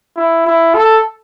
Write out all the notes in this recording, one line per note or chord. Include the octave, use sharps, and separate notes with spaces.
E4
E4
A4